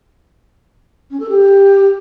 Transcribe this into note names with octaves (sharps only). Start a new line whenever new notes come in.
C#4
A4
G4